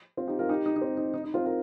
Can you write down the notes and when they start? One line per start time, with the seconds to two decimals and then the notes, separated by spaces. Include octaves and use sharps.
0.17 C4 F4
0.27 D#4 G4
0.39 F4 A#4
0.49 D#4 G4
0.66 D#4
0.76 D#4
0.82 C4
0.97 D#4
1.14 D#4
1.24 D#4
1.34 C4 F4
1.45 F4 A#4